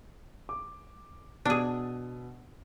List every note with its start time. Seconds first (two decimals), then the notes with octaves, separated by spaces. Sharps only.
0.49 D6
1.45 B2 D4 G#4 E6